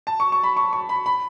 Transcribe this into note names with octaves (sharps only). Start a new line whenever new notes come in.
A5
C#6
C#6
B5
C#6
C#6
B5
B5